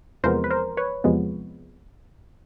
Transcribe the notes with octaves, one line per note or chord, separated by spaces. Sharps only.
E2 C3 F3 G#3 B3 A#4 C5
B4
A#4 C5
B4 C#5
E2 C3 F3 G#3 B3